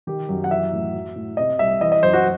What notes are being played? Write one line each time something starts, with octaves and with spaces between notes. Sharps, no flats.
D#3 G4
F#2
F#5
E3 E5
A2
F#3
A2
C3 D#5
C2 E5
E3 D#5
D#5
F#2 C5
F#4